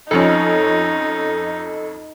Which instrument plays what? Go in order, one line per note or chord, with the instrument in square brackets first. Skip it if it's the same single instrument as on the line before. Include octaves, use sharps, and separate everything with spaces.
[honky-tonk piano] F2 F3 C#4 [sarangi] D#4 [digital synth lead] A4